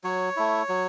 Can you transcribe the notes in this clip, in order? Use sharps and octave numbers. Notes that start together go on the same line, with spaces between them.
F#3 C#5
A3 E4
F#3